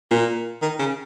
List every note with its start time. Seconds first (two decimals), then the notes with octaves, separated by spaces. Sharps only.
0.11 A#2
0.62 D#3
0.79 C#3